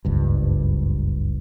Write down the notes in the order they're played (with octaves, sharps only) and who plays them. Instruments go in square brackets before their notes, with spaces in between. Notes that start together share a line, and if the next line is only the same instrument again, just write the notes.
[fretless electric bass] F#1 C#2 G2